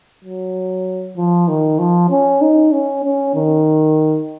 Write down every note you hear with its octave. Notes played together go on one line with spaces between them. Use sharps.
F#3
F3
D#3
F3
C#4
D#4
C#4
C#4
D#3